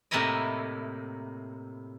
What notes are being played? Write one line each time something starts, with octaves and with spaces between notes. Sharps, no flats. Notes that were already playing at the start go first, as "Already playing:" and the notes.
A2 C3 A#3 D#4 E4 D#5